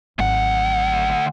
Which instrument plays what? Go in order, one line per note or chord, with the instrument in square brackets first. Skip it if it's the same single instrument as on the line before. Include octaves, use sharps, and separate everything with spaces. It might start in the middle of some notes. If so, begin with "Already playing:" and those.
[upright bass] G#1 F#3 [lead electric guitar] D2 F#5